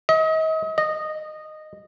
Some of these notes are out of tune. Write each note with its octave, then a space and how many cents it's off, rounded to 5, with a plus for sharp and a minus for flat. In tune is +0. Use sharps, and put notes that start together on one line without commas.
D#5 +40
D#5 -10